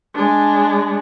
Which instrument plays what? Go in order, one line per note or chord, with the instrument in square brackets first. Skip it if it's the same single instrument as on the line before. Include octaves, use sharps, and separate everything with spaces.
[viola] G#3 D4